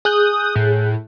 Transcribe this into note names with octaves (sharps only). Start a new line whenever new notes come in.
G#4 D#6 F#6 G6
A2